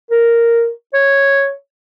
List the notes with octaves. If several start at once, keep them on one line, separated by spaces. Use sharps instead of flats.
A#4
C#5